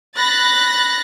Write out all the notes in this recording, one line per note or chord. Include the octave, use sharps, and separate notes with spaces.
B5 F#6 A6 A#6